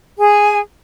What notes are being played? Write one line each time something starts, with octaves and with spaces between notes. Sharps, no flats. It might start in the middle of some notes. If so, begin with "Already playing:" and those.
G#4 G#5